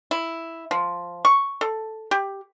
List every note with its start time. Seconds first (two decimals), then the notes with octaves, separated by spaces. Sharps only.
0.11 E4
0.71 F3
1.25 C#6
1.61 A4
2.11 G4